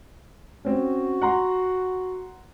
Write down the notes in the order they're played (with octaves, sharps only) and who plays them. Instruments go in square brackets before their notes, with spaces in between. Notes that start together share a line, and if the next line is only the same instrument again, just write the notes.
[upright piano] C4 C#4 [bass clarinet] F#4
[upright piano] F#5 A#5 C6